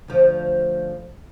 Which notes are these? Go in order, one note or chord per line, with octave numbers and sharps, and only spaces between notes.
D2 F3